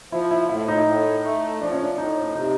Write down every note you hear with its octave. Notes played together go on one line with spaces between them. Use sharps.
F3 E4
E4
A2 E4
D#4
A2
A3
F3 D4
C#4
D4
A2 D#4
C3 D#4